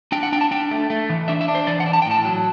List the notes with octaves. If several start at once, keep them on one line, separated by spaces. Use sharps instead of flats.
D4 G5
F#5
D4 G5
A5
D4 G5
A3
A3
E3
D4 E5
E5
D4
C5
E3 D5
F#5
D4
A5
G5
A2 A5
F#3